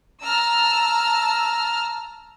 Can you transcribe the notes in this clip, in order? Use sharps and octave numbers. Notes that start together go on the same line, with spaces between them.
A5 A#5 E6 F6